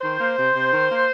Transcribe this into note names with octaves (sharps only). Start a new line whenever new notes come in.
D#3 C5
A#3
C3
C3
D#3
A#3